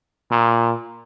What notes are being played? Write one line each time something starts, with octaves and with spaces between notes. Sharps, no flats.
A#2